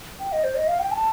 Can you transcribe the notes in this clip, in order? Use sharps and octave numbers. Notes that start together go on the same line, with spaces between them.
G5
D#5
C5
D#5
F5
G5
A5